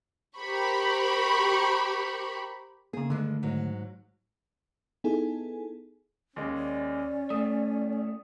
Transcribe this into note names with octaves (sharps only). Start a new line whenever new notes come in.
G4 A#4 C5 B5 C#6
C#3 A#3 G#4
G2 D3 D#3 G#3 A3 D4
G#2 F#3
B3 D#4 E4 G#4 A4 G#5
D#2 G#3 C#4
D5
A2 A3 D#6